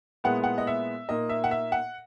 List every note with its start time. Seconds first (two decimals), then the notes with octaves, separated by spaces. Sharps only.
0.24 A#2 G#3 B3 E4 B4 F#5
0.44 F#5
0.58 D#5
0.67 E5
1.08 A#2 A#3 D#4 D#5
1.29 E5
1.44 F#5
1.51 E5
1.72 F#5